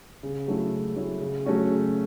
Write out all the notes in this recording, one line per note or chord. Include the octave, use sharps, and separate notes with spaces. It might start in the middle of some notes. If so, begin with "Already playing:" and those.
C#3
F#3 A3 C#4 E4
C#3
F#3 A3 C#4 E4
C#3
F#3 A3 C#4 F#4
C#3